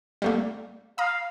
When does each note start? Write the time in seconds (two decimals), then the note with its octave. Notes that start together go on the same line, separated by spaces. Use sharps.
0.22 G3 A3 A#3
0.98 F5 A#5 D#6